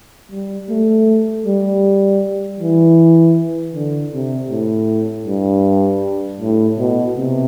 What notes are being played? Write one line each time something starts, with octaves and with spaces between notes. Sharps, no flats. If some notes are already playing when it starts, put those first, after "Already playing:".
G3
A3
G3
E3
D3
C3
A2
G2
A2
B2
C3